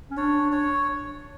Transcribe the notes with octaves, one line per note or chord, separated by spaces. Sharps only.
C#4
D4 C#5
C#5